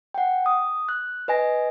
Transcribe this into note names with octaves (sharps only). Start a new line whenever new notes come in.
F#5 G5
D#6
F#6
B4 D#5 G#5 A#6